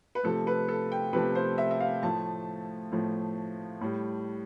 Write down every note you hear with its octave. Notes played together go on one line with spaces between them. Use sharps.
B4
C3 F3 A3 A4
B4
A4
G5
C3 F3 A3 B4
C5
E5
E5
F5
A2 F3 A3 A5
A2 F3 A3
A2 G3